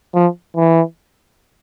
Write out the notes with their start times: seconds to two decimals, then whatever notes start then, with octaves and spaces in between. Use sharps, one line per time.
0.14 F3
0.56 E3